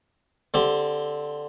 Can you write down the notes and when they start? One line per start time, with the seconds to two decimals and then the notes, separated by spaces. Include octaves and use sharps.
0.54 D3 C4 G4